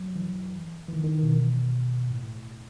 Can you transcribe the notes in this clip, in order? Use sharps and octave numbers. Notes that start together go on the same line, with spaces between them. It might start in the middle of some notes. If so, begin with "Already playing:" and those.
Already playing: F#3
E3
E3
D#3
D#3
B2
A2